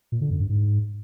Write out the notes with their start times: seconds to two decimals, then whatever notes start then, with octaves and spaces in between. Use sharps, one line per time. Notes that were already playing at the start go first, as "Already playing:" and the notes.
0.12 A#2
0.21 D3
0.31 F#2
0.40 G2
0.49 G#2